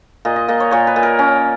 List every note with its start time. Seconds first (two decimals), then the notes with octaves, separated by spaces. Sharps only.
0.25 A#2 D#5
0.36 D#5
0.48 A#2 D#5
0.60 C#5
0.71 A#2 C#5
0.87 B4
0.96 A#2
1.03 A#4
1.19 C#4